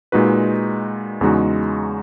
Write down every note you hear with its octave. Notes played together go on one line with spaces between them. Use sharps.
A#2 G#3 D#4 F#4 B4
E2 C#3 G#3 D#4 F#4